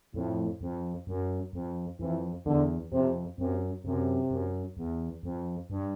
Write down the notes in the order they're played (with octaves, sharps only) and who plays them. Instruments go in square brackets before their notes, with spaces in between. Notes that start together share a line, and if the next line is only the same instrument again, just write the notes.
[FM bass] F2 [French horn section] A2
[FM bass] F2
F#2
F2
[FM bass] F2 [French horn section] E3
[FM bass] E2 [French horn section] D3
[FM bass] F2 [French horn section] C3
[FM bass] F#2 [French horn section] C3
[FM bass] F#2 [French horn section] C3
[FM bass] F#2
E2
F2
G2